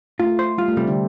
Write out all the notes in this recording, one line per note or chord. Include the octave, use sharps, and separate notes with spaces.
A3 F4
C5
G3 F4
A3
C3 G3 C4
D3 D4